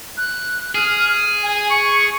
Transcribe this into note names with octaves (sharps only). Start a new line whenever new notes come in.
F#6
G#4 F6
G#5
C#6